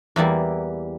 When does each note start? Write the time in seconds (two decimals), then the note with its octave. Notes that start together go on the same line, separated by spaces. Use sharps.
0.16 E2 E3 G3 A#3